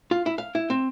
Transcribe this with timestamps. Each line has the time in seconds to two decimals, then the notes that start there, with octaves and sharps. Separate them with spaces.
0.11 F4
0.26 E4
0.38 F5
0.55 E4
0.70 C4